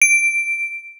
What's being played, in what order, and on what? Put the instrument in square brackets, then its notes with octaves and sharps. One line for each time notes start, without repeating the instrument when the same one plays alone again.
[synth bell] D7